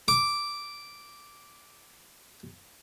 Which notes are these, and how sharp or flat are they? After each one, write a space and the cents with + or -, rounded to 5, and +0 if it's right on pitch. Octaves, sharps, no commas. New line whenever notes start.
D6 -5